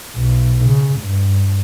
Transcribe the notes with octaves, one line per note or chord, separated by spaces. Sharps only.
B1
C#3
G2